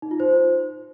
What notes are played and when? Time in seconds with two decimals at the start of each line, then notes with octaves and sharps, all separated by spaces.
0.02 D#4
0.11 F4
0.20 C5